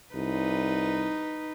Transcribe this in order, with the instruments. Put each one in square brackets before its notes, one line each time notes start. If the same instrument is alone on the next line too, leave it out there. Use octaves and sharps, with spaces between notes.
[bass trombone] C2 [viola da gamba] D#4 B4